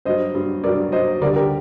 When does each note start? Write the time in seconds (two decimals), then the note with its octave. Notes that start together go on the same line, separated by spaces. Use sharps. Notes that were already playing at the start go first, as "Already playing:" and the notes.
0.05 G2 F#3 C5 D#5
0.34 G2 F#3
0.64 G2 F#3 A#4 D5
0.92 G2 F#3 C5 D#5
1.21 D2 D3 G3 A#4 D5
1.36 G4 A#4